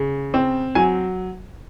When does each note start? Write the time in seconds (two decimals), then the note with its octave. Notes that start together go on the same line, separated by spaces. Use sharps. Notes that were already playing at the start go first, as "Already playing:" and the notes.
Already playing: C#3
0.34 C4
0.75 F#3 G#5